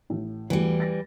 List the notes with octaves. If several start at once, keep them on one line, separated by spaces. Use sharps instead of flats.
A1 A2
E2 E3 G3 A3 F#4
A6 A#6